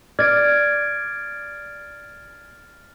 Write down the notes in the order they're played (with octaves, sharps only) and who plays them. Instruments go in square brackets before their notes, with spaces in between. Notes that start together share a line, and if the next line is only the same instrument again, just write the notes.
[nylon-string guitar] D5 [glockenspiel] F6 A6 D7 [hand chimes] G#6